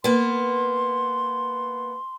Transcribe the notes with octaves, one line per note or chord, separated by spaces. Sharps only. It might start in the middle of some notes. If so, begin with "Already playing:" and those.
A#3 B3 C6